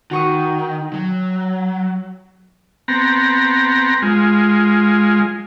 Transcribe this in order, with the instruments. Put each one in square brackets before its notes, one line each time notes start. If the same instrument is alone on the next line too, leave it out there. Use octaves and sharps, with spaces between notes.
[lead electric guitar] D#3 [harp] F#4 C#6 D#6
[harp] G5
[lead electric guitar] F#3
[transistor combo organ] B3 C4 A#5
G#3 F4